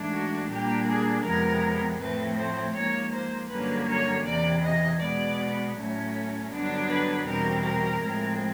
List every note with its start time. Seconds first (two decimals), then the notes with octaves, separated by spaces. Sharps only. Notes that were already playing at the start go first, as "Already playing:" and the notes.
Already playing: G#2 E3 A3 D4
0.11 F#4
0.48 A#2 G3 A#3 D4 G4
0.86 G#4
1.23 F2 C3 F3 G#3 B3 A#4
1.99 A2 F3 A3 C4 B4
2.36 C5
2.74 G#2 F3 A#3 C#5
3.12 C5
3.49 G2 D3 F#3 A#3 C#4 B4
3.87 C#5
4.25 E2 C3 E3 D5
4.62 D#5
5.00 B2 G#3 B3 D5
5.75 A2 F#3 A3 C#4
6.50 G2 D3 F#3 B3 D4
6.89 B4
7.26 E2 B2 G3 C4 A#4
7.63 A#4
8.01 A2 F3 G#3 C4